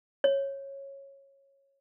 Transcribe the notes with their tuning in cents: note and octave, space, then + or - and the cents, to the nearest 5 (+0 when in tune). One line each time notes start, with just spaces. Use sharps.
C#5 -15